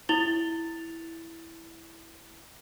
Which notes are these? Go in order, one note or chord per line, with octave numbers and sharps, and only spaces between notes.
E4 A6 F7 G7